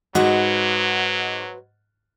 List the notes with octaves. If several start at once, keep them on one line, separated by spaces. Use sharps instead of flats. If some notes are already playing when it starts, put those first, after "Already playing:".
G#2 F#3 F#4 B4 C5 D#5 F#5